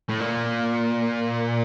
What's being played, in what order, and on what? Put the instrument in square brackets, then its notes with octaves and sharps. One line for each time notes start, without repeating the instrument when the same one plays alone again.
[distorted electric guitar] A2
A#2